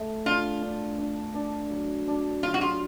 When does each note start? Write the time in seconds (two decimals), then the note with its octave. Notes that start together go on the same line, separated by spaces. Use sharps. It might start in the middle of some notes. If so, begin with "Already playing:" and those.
Already playing: A3
0.25 D4 F4
0.62 D4
0.98 D4
1.34 D4
1.70 F#3
2.08 D4
2.43 F#3 F4
2.54 F#4
2.61 F4